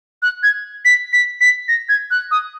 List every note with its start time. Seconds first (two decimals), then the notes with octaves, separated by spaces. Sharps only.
0.22 F#6
0.43 G#6
0.85 B6
1.13 B6
1.41 B6
1.68 A#6
1.89 G#6
2.11 F#6
2.31 D#6